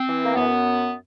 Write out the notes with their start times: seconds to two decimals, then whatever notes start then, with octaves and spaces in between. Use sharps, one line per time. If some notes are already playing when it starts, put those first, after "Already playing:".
Already playing: C4
0.09 E3
0.23 A#3
0.35 F#2 B3